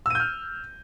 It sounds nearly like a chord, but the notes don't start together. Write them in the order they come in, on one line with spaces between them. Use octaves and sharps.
E6 D#7 G6 F6